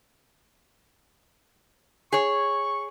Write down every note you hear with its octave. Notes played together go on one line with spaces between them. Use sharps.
G#4 C#5 C#6